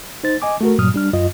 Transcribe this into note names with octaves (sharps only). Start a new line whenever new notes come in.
D#4 C5 A6
D#5 G#5 D6
A3 F#4 A#4
G2 A#2 F#3 D#6 F6
G3 D4 F6
F#2 F4 D#5